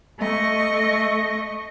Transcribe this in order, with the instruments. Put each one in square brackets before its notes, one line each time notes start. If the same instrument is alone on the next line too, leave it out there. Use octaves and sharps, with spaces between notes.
[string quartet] A3 D#5 C#6